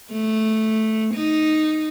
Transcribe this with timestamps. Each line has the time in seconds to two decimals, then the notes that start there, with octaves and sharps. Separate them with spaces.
0.13 A3
1.15 D#4